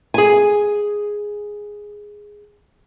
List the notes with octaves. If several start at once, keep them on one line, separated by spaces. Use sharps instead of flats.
G#4 G#5